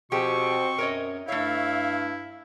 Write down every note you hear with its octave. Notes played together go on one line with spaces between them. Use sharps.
B2 F3 C4 G4 G#4 C#6
F#2 A#4 C#5 D#5
G2 A3 E4 C#5 E5 F5